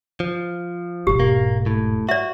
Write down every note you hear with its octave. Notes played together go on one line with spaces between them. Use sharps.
F3
E1 G#2 G4
A#3
A2
F#4 D5 E5